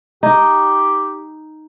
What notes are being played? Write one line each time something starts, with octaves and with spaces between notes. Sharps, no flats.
D#4 G4